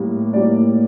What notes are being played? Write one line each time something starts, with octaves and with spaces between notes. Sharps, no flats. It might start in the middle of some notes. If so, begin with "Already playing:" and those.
Already playing: A2 G3 A#3
A2 G3 A#3 D5